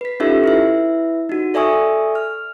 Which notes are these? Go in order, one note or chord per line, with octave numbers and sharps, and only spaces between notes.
B4 B6
C#4 D#4 F4 G4 A4 E5
E4 B4 E5
D#4 F#4
A4 D5 E5 G#5 C#6 D#6
F6